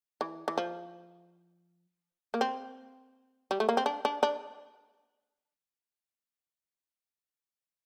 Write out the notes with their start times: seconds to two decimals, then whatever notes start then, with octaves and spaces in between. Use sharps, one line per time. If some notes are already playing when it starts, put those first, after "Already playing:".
0.21 E3
0.48 E3
0.58 F3
2.34 A#3
2.41 C4
3.51 G3
3.60 A3
3.69 A#3
3.77 C4
3.86 D4
4.05 D4
4.23 D4